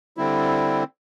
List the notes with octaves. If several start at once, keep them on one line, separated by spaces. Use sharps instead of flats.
D3 G3 C4 E4